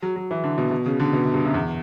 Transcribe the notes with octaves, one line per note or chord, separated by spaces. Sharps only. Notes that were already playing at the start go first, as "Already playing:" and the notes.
F#3
F#3
E3
D3
B2
B2
C#3
D3
B2
F#2
G2
F#2
E2